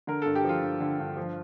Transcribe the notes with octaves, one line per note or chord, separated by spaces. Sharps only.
D3 A#4
G2 A4
G4
F3 F4
G2
D3
G2
F3